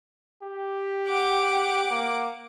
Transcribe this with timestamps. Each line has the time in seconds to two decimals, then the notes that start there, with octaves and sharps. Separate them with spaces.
0.42 G4
1.08 F#5 D6
1.91 A#3